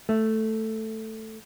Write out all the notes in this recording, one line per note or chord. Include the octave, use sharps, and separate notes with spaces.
A3